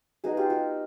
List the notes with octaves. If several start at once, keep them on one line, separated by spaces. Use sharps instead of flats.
G#3 B3 D#4 F#4 G#4
F4 G4
F#4